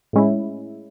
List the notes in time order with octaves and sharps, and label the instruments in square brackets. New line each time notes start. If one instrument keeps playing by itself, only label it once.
[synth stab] A2 G#3 C#4 E4